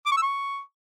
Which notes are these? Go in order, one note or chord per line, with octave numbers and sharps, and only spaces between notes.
D6
C#6
E6
C#6